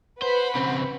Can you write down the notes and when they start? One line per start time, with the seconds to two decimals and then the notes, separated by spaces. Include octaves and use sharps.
0.22 B4 C5 F#5 B5
0.55 C#3 C4